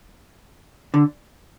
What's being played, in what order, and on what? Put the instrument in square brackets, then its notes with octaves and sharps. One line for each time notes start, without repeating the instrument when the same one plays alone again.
[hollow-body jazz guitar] D3